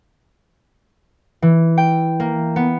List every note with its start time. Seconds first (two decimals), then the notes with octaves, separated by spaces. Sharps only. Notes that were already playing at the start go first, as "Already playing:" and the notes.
1.42 E3
1.78 G5
2.20 A#3
2.56 B3